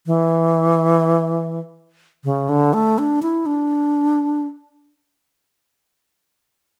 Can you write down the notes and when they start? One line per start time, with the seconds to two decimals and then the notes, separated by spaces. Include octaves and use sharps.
0.06 E3
2.24 C#3
2.49 D3
2.73 A3
2.98 D4
3.22 E4
3.46 D4